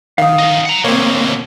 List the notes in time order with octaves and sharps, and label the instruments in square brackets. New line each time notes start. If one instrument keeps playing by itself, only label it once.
[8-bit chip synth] D#3 [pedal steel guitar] F5 D#6
[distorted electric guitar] C#4 D#4
F#5 A#5
[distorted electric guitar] D2 B2 [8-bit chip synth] A#3 C4 [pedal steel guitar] C#5